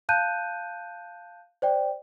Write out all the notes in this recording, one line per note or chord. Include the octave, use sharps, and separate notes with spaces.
F5 A5 F#6 G6 D#7
C5 D5 G5